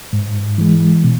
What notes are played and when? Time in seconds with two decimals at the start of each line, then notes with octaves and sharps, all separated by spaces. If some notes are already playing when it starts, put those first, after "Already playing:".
0.13 G#2
0.58 E3 G#3
1.04 B2